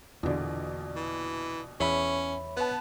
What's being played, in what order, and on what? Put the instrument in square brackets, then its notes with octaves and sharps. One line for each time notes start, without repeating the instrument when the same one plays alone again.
[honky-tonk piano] A#1 B2 D5 [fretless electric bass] E2 D3
[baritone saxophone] E3
[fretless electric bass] E2 [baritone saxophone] C#4 [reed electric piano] C#5 E5 B5
[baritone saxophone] B3 [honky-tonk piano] B4 A5